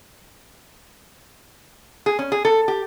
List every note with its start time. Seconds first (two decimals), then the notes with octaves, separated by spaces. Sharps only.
2.06 G#4
2.19 C#4
2.32 G#4
2.45 A4
2.68 G4